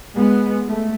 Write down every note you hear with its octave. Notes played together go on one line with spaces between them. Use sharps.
G#3 B3
A3